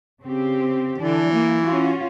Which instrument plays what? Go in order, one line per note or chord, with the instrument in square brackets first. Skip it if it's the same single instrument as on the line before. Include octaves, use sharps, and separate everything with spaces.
[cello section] C#3 C4 G4
[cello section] D3 D4 [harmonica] E3
[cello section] F#3 A#3
C#4 F4 F#4